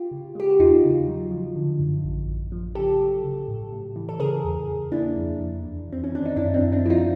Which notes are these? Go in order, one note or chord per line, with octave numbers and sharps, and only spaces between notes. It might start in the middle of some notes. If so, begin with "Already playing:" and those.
Already playing: F4 G4
C#3
G#3 G4
F#4
E2 D#4 F4
C#3
F#3
F3
D3
F#2
A1
A1
F3
C#3 G4 A4
F#3
C#3
A2
A2
E3
A4
C#3 G#4 A#4
E2
E2
A#3 D4 E4
F2
F2
E2
E2 C4
C#4
D#3 D4
D#4
F#2 D4 E4
C4 D4
F#2
C4 D4
F3 D#4 E4 F4